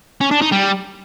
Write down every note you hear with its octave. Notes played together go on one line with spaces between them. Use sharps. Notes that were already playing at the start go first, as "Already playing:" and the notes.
C#4
D4
D#4
G3